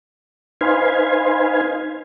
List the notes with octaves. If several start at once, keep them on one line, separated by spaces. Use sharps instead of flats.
D#4 B4 C5 F5 G#5